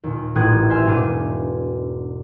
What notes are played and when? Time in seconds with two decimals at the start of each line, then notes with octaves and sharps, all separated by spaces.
0.04 D#2 A#2
0.35 D#1 A1 A2 D#6 F#6 G#6
0.70 C5 E5 G#5 F6
0.85 E1 G#2 B2 D4 D#7